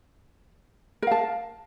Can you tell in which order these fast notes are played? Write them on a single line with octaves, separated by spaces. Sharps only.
A#4 F5 A5